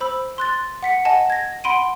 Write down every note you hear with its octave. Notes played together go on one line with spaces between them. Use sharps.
C5 B5 E6
C6 F#6 A6
F#5 B6 C#7
D#5 F#5 G#5 A5
G#6 A#6
F#5 B5 C6 D7 D#7